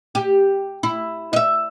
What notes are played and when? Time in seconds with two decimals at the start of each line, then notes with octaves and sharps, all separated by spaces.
0.15 G4
0.83 E4
1.33 D#5 E5